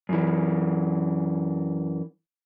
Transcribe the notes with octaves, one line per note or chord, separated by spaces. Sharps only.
F#2 E3